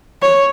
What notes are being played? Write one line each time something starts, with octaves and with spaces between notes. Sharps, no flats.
C#5